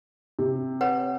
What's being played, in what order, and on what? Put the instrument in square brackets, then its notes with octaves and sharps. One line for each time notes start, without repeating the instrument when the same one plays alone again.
[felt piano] C3
[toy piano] B4 C#5 F#5